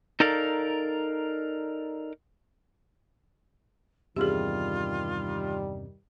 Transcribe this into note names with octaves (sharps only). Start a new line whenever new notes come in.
D#4 A4 A#4 D5 F5
E2 G2 C3 D#3 G3 F4 G4 G#4